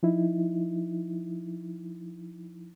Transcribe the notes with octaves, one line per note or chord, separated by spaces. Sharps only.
F3 D#4 E4